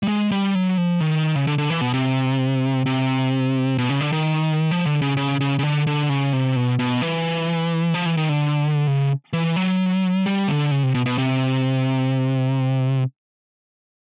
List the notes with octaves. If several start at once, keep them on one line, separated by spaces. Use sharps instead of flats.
G3
G#3
G3
F#3
F3
D#3
C#3
D3
D3
E3
B2
C3
C3
B2
C#3
D3
D#3
F3
D3
C#3
C#3
C#3
C#3
D3
D3
C#3
C3
B2
B2
E3
F3
E3
D#3
D3
C#3
E3
F#3
G3
D3
C#3
C3
B2
B2
C3